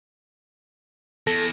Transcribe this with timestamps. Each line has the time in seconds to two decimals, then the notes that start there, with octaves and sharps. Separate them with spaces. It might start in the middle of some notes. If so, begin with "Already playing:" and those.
1.27 E2 A4 A#6